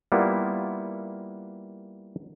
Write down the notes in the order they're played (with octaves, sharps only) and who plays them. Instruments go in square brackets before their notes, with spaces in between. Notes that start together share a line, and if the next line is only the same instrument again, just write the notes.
[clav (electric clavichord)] G3 A#3 B3 E4 F4